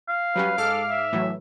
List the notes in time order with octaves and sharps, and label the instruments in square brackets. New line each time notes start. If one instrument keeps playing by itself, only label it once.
[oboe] F5
[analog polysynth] F#3 G3 C#4 [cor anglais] B4
[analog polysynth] G#2 D6 F6 [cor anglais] A4
[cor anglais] E5
[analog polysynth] A2 E3 F#3